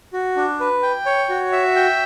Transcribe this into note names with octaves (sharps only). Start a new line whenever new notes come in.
F#4
D4
B4
G5
C#5
F#4
E5
G5